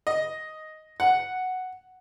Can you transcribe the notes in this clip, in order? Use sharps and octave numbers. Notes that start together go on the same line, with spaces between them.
D#5
F#5